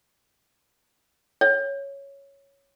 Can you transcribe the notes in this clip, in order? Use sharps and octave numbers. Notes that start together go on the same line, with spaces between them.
C#5